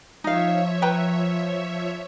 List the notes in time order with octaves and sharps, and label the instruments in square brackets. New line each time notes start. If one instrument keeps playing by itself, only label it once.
[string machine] F3 C#5 E5 [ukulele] D#4 F5
[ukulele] B4 G5 A#5